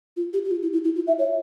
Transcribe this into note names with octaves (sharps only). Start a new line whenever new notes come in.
F4
G4
G4
F4
E4
E4
E4
F4
E5
C#5